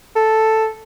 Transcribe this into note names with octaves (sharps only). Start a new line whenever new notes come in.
A4